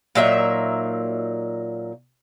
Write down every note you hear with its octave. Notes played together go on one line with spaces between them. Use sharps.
A#2 F#3 D#4 E5